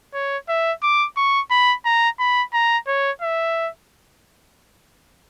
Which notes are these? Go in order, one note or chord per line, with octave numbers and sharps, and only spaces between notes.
C#5
E5
D6
C#6
B5
A#5
B5
A#5
C#5
E5